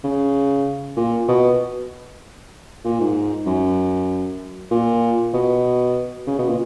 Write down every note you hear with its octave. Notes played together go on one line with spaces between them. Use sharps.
C#3
A#2
B2
A#2
G#2
F#2
A#2
B2
C#3
B2
A#2